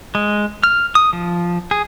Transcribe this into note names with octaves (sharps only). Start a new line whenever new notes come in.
G#3
F6
D#6
F3
G#4